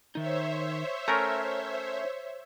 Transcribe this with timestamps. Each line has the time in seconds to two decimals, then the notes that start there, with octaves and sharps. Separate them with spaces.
0.15 D#3 D#4 C5 C#5 E5
1.08 A3 C#4 A#4 A#5